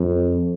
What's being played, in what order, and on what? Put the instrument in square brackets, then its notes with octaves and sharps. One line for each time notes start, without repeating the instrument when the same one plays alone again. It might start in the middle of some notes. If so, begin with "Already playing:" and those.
Already playing: [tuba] F2